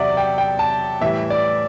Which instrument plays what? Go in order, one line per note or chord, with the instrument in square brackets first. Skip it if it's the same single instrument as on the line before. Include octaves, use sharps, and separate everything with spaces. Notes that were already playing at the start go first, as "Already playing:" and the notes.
Already playing: [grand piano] E2 C3 F#3 D5 E5 F#5
G5
G5
A5
A2 E3 G3 E5
D5